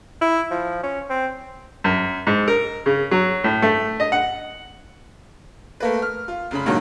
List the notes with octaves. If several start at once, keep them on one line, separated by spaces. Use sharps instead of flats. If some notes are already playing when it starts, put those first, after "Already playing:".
E4
F3
C#4
C4
F#2
G#2
A#4
C#3
F#3
A2
A3
D#5
F#5
A3 A#3 B4
F6
F4
F1 C#3 B5
C#2 G2 A#2 D#3 F#3